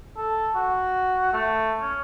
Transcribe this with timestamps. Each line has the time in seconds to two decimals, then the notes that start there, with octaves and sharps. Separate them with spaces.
0.17 A4
0.55 F#4
1.33 A3
1.81 C#4